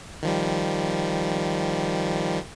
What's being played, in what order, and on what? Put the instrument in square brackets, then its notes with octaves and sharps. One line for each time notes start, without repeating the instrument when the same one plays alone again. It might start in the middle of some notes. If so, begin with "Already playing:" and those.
[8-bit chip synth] D#3 F3 G3